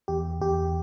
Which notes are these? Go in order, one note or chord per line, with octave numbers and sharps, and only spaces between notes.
E2 G4
E2 G4